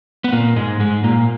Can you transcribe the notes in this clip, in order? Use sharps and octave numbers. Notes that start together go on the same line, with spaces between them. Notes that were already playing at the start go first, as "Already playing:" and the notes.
B3
A#2 A#3
G#2 G#3
G#2 G#3
A#2 A#3